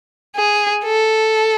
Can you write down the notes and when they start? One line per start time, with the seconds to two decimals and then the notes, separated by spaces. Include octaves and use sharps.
0.36 G#4
0.84 A4